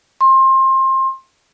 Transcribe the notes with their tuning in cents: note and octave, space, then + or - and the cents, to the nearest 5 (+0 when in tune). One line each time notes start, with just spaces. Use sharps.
C6 +25